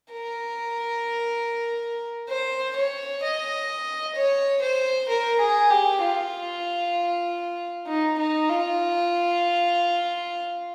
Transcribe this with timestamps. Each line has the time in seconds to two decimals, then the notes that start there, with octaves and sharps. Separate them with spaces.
0.13 A#4
2.29 C5
2.76 C#5
3.23 D#5
4.16 C#5
4.62 C5
5.09 A#4
5.40 G#4
5.70 G4
6.02 F4
7.87 D#4
8.18 D#4
8.49 F4